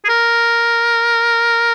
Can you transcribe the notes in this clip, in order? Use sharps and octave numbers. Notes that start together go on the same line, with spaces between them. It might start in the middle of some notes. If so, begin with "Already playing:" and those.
G#4
A#4